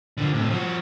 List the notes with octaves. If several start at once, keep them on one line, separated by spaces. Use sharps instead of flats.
D3 F3
A2 C3
F3 F#4